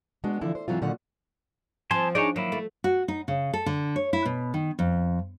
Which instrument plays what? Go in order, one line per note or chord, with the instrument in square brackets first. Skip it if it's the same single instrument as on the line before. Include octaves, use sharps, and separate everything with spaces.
[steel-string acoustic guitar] G#3 B3 D4 F#4
D3 E3 F3 E4
C5
G#2 E3 F#3 C4 F4
A#2 D3 D#3 F#3 F4 F#5
[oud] F3 C4 [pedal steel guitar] G#5 A5 C6
[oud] D4 D#4 G#4 [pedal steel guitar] C#5 D5
[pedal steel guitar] D#3 A#3 E4 [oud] F#3
[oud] A3
[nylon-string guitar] F#4
D#4
C#3
A4
D3
C#5
E4
B2
D#3
F2